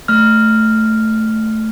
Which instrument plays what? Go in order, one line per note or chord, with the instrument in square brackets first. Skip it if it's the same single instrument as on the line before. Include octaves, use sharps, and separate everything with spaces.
[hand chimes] A3 F6